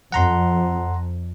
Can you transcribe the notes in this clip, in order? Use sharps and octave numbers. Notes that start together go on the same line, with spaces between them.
F2 F#5 A#5 C6